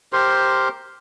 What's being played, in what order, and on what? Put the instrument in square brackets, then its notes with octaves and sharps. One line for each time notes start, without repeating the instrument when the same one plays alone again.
[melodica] G4 A#4 C5 C6